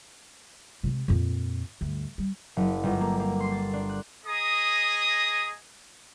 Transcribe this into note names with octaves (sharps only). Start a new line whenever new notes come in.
C3 G#3
F2 A#2
D2 G2
G3
F#1
G1
A#3
A#3
C6
A6
D4
F#6
G#4 D#5 A#5 D#6